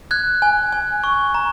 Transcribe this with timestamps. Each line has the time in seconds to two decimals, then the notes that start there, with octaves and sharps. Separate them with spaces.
0.11 F#6 G#6
0.42 G#5
0.73 G#5
1.04 C#6
1.35 A#5